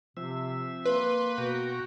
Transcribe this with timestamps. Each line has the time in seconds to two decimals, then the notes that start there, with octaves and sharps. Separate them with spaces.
0.17 C3 F3 C4 E5
0.85 A#3 B4 C6
1.38 B2 F#4 G5 A#5